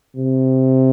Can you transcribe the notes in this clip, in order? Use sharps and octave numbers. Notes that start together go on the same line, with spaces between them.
C3